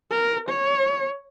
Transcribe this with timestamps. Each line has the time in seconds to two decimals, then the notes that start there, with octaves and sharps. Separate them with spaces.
0.11 A#4
0.49 C#5